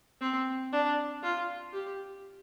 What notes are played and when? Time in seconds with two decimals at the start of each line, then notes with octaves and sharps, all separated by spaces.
0.21 C4
0.72 D4
1.23 F4
1.73 G4